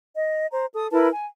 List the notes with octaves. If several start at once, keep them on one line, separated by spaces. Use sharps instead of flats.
D#5
C5 A#5
A4 D#6
E4 A#4 B4 A5
G#5